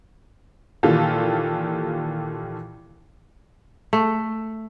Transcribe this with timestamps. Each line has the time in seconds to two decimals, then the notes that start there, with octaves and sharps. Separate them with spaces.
0.83 A#2 D#3 E3 F4 G4 A4
3.93 A3